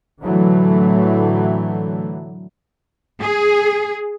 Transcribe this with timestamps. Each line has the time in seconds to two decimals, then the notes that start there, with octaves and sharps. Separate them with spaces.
0.21 A2 D3 E3 F#3 A3
3.20 G#4